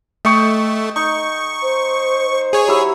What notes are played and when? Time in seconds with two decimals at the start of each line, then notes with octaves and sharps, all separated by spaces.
0.25 A3 D#5 G5 C#6
0.96 D#4 C#6
1.62 C5
2.30 C5
2.53 G#4 C#5
2.68 F#3 E4 G4 E6